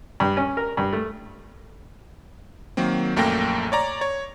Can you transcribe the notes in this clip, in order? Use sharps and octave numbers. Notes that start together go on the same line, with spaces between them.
G2
C#4
A#4
G2
A3
D#3 F#3 A#3 C4
A#1 F#2 A3 A#3 G5 A#6
C#5 D5 A#5
C#5